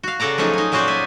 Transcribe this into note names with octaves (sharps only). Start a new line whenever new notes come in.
F#4 F5
C#3 F#4 A4 D5 A#5
F3 F#3 A3 C#4 D#4 G#4
D#4 G#5
A#2 F#3 C#4 F#4 C5 D5
E5 G#5